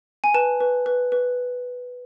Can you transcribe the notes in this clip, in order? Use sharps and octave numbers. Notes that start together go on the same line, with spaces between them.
G#5
B4 A5
B4
B4
B4